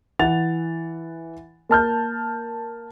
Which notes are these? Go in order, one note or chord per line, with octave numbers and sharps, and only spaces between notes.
E3 F#5 A6 F7
A#3 A5 F6 G6